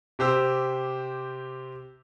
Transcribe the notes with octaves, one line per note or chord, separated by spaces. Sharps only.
C3 G4 C5 E6